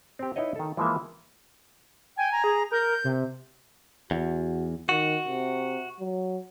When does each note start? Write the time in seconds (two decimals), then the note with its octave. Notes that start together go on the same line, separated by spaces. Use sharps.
0.19 C4 G4
0.36 D#4 E4 B4 C#5 D#5
0.56 D#3 A4
0.77 E3 F3 G#3 A#3 E5
2.17 G5 G#5
2.32 A#5
2.44 G#4
2.71 A#4 G6
3.04 C3
4.11 E2 F#4
4.89 D#3 F#4
5.27 C3
6.00 F#3